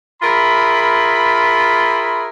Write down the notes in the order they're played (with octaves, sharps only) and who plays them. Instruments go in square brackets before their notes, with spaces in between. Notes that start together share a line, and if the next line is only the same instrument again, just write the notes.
[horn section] F4 G#4 A#4 E5 B5